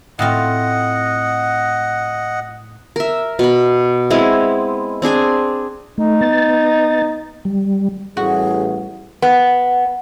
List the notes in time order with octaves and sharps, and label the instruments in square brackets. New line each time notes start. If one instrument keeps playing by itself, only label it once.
[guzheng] A2 C4 F4 [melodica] D#5 F#5
[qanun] A#4 E5
B2 B5
G#3 B3 C4 E4
C4 D4 G#4 G#5
[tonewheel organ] A3 [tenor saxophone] D#4
[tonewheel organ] B3 A6
G3
[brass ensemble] A1 [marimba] G3 E4 A4 [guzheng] F#4 [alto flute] G#4
[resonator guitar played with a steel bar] B3